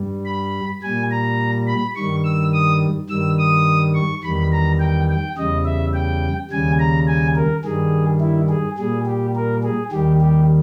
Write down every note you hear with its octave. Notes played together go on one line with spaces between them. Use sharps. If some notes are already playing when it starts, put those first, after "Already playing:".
Already playing: G2 G3
B5
A#2 G3 G#5
A#5
B5
G2 D#3 G3 C#6
E6
D#6
G2 D#3 G3 E6
D#6
C#6
E2 D#3 G3 B5
A#5
G5
G5
E2 C#3 G3 D#5
E5
G5
D#2 C#3 G3 G#5
A#5
G#5
A#4
G2 D#3 G3 G#4
E4
G#4
A#2 G3 G#4
G4
A#4
G#4
D#2 D#3 G3 G4
G4